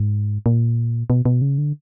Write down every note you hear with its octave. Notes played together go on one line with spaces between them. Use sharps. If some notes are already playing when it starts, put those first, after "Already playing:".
Already playing: G#2
A#2
B2
B2
C#3
D3